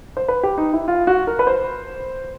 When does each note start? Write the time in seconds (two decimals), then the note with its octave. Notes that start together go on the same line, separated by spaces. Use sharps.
0.17 C5
0.28 B4
0.43 G4
0.58 D#4
0.73 E4
0.88 F4
1.07 F#4
1.27 A#4
1.39 B4
1.47 C5